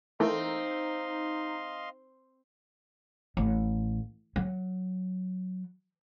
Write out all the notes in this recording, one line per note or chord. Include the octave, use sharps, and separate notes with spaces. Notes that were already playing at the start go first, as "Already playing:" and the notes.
E3 A3 A#3 C4 D#4 D#5 F5 C6
A1
F#3